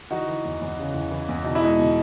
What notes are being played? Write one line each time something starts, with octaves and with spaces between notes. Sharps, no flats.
E3 D#4 F#4
E3
E2
E2
C#3
E2
E3
E2
B2 D#4
E4
G#3 D#4
B2